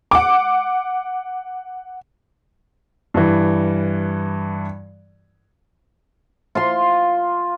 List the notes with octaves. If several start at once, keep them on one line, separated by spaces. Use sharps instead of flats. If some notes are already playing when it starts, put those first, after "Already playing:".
F#5 D6
G2 E3
F4 F5 C6